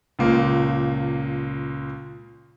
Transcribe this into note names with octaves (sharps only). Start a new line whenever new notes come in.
C#2 A#2 A#3